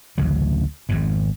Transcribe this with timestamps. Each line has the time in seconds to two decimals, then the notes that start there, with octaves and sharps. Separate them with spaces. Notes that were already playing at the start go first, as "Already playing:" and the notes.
0.18 A1 D2 C#3 F#3
0.89 G#1 F2 G#2